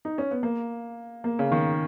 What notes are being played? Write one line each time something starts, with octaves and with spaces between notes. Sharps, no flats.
D#4
C#4
B3
A#3
A#3
C#3
D#3